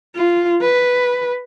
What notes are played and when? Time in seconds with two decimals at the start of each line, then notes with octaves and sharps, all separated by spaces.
0.16 F4
0.61 B4